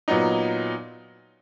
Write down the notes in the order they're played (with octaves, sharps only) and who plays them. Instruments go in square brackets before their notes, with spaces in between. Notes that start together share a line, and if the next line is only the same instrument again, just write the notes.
[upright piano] A#2 F#3 B3 D#4